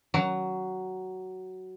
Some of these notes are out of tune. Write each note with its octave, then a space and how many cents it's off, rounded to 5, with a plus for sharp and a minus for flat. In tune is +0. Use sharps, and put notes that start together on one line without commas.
F#3 +10